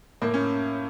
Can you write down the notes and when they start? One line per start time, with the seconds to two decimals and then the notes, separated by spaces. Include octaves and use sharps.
0.22 A2 A#3
0.34 C#4